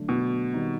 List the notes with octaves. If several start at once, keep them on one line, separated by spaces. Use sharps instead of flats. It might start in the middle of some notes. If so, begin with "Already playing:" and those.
Already playing: D3 F#3 A3 D4
B2
D#3 G3 C4 D#4